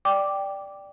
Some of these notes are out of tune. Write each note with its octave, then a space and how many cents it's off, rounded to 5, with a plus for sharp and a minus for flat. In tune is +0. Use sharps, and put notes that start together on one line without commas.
D5 +0 G5 +0 D6 +0